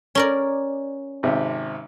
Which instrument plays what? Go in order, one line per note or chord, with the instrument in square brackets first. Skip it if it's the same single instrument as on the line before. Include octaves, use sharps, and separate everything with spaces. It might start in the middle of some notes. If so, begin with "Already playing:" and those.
[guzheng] C#4 A#4 D5
[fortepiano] G#1 C3